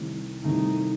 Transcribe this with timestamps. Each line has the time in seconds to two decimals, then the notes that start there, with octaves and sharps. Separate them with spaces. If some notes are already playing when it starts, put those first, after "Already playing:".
Already playing: C2 C3 D#3 A3
0.44 C2 C3 D#3 A3 D#4